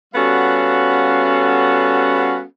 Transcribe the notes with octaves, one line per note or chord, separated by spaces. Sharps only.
G3 B3 C#4 F#4 A4 F5